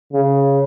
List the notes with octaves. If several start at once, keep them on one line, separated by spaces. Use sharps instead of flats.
C#3